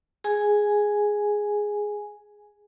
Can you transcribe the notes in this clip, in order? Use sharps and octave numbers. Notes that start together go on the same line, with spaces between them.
G#4 G#5